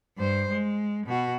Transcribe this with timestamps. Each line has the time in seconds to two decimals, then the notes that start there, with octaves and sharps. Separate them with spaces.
0.18 G2 C5
0.50 G#3
1.07 B2 F#4